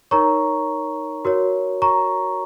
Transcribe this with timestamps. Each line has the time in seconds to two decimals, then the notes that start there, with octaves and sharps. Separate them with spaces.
0.11 D#4 A#4 C#5 A#5 C#6
1.25 F#4 A#4 C#5
1.82 A#5 C#6